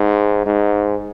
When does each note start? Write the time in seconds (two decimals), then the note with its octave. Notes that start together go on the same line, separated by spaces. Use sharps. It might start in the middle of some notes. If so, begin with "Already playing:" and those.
Already playing: G#2
0.46 G#2